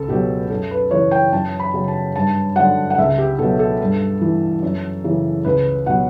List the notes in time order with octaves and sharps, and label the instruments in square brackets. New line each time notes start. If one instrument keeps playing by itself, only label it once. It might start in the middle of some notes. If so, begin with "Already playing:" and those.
Already playing: [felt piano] C#2 A4
B2 F#3 G4
F#2 A4
B4
C#3 E3 C#5
G5
F#2 A5
B5
C#3 F#3
A5
G2 A5
D3 F#3 F#5
F#5
C#2 E5
G4
B2 F#3 A4
A4
G2
E3
F#2
C#3 E3
C#2 B4
B2 F#3 F#5